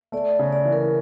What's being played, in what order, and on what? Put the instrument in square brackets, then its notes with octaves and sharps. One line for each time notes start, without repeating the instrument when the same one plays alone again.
[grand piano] A3 [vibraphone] D5
[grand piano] C#3
[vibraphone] D5
[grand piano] E3
[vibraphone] A#4